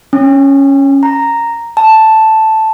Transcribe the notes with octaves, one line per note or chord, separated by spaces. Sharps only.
C#4
A#5
A5